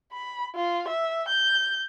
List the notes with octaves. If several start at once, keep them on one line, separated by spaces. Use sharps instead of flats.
B5
F4
E5
G6